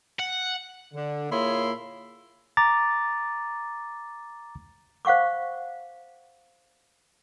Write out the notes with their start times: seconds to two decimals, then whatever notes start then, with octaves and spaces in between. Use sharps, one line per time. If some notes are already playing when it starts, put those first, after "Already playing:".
0.19 F#5
0.94 D3
1.31 A#2 A#3 E4 G#4 C#5 C6
2.57 A#5 D6 A6
5.05 C5 F5 F#5 C#6 D6